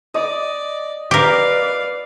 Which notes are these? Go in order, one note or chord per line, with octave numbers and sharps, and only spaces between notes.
D5 D#5
G4 A#4 B4 D5 F5